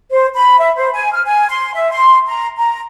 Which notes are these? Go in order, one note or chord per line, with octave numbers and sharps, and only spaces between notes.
C5
B5
E5
C5
G#5
F6
G#5
C6
E5
C6
A#5
A#5